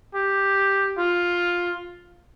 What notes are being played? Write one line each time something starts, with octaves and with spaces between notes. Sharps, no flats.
G4
F4